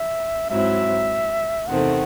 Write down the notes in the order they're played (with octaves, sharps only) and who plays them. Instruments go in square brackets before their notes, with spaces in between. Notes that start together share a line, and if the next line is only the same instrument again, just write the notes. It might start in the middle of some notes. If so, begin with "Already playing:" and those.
Already playing: [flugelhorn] E5
[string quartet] G#2 F#3 C4 E4 [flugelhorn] E5
[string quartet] E2 C3 D#3 A3 C4 [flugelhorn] F#5